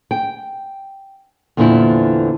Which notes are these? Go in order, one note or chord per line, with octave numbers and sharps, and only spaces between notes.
G5
E2 A#2 D3 E3 C4 E4